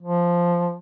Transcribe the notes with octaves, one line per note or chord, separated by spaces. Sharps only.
F3